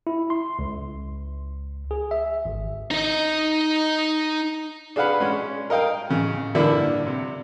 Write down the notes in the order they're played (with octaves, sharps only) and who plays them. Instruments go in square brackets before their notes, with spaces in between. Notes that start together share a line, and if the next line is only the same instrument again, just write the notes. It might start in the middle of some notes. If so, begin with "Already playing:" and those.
[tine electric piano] E4
C6
C#2
G#4
E5
G#1
[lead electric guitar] D#4 D#5
[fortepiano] D4 G#4 B4 F5 F#5 B5
G#3 C#4
A#4 D#5 F5 G5
A1 C#3
G2 D3 A#3 D4 E4
C3